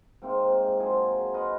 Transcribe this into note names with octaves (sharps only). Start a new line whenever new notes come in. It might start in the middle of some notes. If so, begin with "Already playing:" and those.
G#2 C3 A#3 C4
F3 F#3 F4 G#4
F4 B4 D#5 F#5